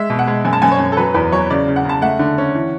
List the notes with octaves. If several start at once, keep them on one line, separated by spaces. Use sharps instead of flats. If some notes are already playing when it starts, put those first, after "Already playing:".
Already playing: G#3 E5
B2
F#5
G#3
F#2 G#5
A5
F#2 G#5
C#5
F#2
A4
F#3 B4
E2 B4
F#3 C#5
C#3 D5
C#3
F#5
C#3 A5
A3 F#5
D3
C#4
E3